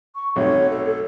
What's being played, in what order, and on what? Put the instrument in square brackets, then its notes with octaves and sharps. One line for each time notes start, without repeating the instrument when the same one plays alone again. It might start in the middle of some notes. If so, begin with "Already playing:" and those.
[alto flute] C#6
[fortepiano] B1 C3 A3 [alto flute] C#5
[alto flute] A4
A4